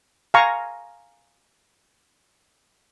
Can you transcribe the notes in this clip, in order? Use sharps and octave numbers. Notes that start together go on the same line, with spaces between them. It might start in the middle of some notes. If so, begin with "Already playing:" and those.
F5 G#5 A#5 C#6